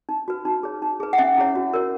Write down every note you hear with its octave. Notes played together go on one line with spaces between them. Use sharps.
D#4
F#4 B4
D#4
G#4 C#5
D#4
G#4 B4
F#5
C#4 E5
E4 G#4 C#5
F#4
A#4 C#5